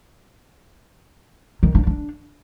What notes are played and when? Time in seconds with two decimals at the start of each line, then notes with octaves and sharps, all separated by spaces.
1.63 D#3
1.75 D4
1.87 D4